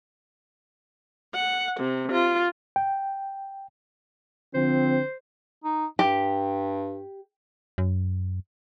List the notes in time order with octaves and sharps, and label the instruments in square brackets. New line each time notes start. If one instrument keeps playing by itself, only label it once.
[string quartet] F#5
C3
F4
[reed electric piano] G5
[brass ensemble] D3 F3 C4 [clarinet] C5
[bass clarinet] D#4
[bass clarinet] G2 [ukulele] G4
[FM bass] F#2